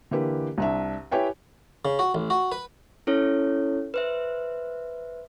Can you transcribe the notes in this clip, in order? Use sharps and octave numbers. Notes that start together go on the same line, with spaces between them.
D3 E3 A#3 G4 B4
C2 D4 E5
E4 G4 B4 C#5 G5 G#5
C#3
F#4
A1
F#4
B4
C#4 E4 A4 C#5
B4 C5 E5